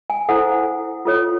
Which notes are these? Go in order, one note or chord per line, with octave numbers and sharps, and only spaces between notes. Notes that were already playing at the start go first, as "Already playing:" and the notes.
G#5
E4 A4 C5 F#5
F4 A4 C#5